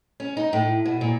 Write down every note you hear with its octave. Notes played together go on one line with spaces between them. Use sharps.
C#4
D#4
A2
B2
A#2